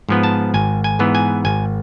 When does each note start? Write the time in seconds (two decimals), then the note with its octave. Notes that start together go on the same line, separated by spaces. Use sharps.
0.09 G#2 F3 B3
0.23 A5
0.54 G#1 G#5
0.84 G#5
0.99 G#2 E3 B3
1.15 G#5
1.45 G#1 G#5